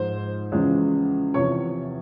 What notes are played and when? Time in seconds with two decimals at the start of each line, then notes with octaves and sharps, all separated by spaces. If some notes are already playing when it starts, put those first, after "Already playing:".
Already playing: G#2 F3 G#3 C5
0.52 E2 C#3 F3 G#3
1.34 E2 C3 F3 C#5 C#6